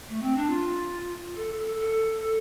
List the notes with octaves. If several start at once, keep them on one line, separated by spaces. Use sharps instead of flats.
A3
C4
D4
F4
A4
A4
A4